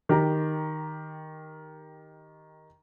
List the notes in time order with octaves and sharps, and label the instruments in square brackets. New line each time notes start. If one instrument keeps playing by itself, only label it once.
[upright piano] D#3 G4 A#5